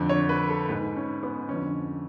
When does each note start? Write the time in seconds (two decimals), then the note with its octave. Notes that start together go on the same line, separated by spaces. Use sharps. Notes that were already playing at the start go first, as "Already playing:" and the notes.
Already playing: F2 D3
0.09 C#5
0.29 B4
0.49 A4
0.69 G#2 B4
0.96 C#4
1.23 B3
1.49 F2 D3 C#4